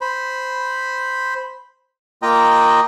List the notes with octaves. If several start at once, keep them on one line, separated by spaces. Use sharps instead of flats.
C5 B5
A#3 F4 D#5 G5 A#5 D#6